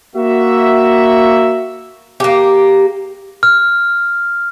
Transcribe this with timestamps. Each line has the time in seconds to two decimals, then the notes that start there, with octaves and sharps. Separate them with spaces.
0.16 A#3 F#4 E5
2.20 A#3 G4
3.43 F6